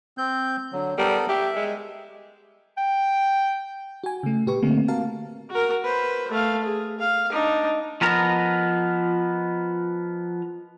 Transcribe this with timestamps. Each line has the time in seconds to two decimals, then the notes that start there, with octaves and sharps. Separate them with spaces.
0.18 C4 G6
0.73 D3 F#3
0.98 G3 B3 A4 A#4
1.29 G4 E5
1.56 G#3
2.77 G5
4.04 F#4 G#5
4.23 C#3 A3
4.47 A#2 G4 B4 C#6
4.63 D3 A3 A#3 C4
4.88 F#4 A#4 F5 A5
5.50 F#4 A#4
5.84 B4 C5
6.32 A3 F5
6.64 G#4
6.99 F5
7.32 D4 D#4
8.01 F3 B3 A#4 D#5 A#5